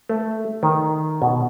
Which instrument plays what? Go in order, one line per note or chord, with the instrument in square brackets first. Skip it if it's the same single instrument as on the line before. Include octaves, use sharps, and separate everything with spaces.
[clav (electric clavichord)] A3
D#3
B2